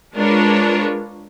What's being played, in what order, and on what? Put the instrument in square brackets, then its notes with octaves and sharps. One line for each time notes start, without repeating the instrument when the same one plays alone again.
[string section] G#3 D4 F4 A#4 B4 C#5